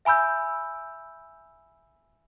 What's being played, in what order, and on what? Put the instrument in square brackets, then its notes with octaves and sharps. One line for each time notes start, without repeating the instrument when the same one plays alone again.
[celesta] E5 G#5 B5 E6 G6